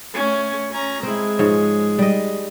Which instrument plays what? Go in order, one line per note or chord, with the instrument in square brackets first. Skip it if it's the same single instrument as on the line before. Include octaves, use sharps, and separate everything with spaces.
[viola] A3 C#4
C#4 A#5
[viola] G#3 [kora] C4 E4
[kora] G#2 F3 C#5
G3 D#5